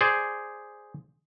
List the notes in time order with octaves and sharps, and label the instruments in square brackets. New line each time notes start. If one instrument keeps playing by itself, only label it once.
[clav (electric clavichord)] G#4 C5 D5